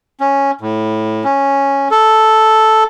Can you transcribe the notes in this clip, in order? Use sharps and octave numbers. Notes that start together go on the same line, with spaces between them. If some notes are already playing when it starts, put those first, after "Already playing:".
C#4
A2
C#4
A4